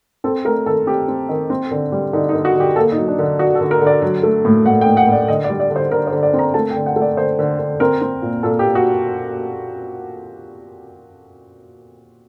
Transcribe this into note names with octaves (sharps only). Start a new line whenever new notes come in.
C4 A4
A3 A#4
D#3 A4
C4 G4
C4
D#3
C4
D3
G3
D3 D#4
D#4
D3
F#4
D3 G4
A#3 A4
D#4
F#3
D4
D3
D3 F#4
A4
D3
A#4
D3
D5
F#3
A3
A2
A2 F#5
G5
A2
F#5
A2
D5
D3 D#5
D5
G3
D5
D3
C5
D3 A#4
C5
D3
D5
C4
A#5
A3 A5
G5
D3
F#5
A3
D5
D3 C5
D3
D3
C4 A#4
C4
A#2
A#2 A4
G4
A#2
F#4